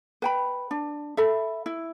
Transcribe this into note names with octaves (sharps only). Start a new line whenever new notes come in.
B4 G5 B5
D4
A4 E5 B5
E4